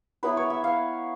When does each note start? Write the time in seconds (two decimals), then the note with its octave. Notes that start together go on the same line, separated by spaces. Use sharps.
0.23 F#3 B3 E4 B4
0.37 C#5
0.50 E5
0.64 F5